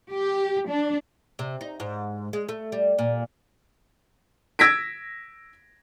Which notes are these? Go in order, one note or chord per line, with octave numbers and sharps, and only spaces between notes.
G4
D4
C3
D#4
G#2
G#3
A3
G3
A#2
E6 G#6 A#6 B6 D7